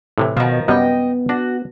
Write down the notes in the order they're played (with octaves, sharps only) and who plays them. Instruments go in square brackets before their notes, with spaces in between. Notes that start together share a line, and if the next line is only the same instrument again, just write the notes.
[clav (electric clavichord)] A2 C3 E3
[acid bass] B2 [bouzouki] D#3 F3 [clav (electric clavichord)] F4 F#4
[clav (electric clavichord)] F#2 C3 G3 [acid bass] B3 [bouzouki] D#5 G5
[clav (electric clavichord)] D4 [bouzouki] F#4